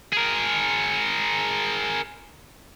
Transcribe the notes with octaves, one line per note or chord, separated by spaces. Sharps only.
G#4 A#4